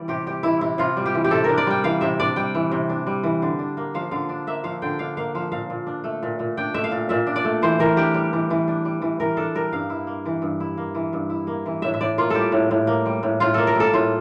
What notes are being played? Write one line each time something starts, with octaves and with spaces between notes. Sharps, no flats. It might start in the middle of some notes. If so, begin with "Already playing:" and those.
Already playing: E3 G3 D5
C3 G4
G3 G4
E3 E4
C3 E4
C3 F4
G3
G4
E3
G4
C3 A4
D4 A#4
D5
G3 G5
E3 F5
C3 E5
D4 D5
G3 G5
E3
C3
D4
G3
E3
D3
D4
A#3
F3 F5
D3 F5
D4
A#3 E5
F3 F5
D3 G5
D4 F5
A#3 F5
F3 F5
A#2 F5
A#2
D4
A3
A#2
A#2
D4 G5
A3 E5
F5
A#2
A#2 E5
D4
D5
A3
E3 C5
E3 A#4
D4 G4
G3
E3
E3
D4
G3
E3
E3 A#4
D4 A4
G3 A#4
G2 F5
E4
A#3
E3
G2
E4
A#3
E3
G2
E4
A#3
E3
A2 E5
E5
A2 D5
A#3 F4
G3 G4 A4
A2
A2
A#3
G3
A2
A2 F4
A#3 A4
A#4
G3 A4
A2 F4